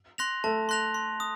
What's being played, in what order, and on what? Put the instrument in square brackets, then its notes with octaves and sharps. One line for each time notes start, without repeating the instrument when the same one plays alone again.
[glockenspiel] C6 F#6 A#6 F7
[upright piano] A3 [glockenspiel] A5
[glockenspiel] C6 F#6 A#6 F7
C6
D#6